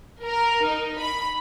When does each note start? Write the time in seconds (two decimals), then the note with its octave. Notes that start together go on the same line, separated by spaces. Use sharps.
0.23 A#4
0.65 D#4
0.98 B5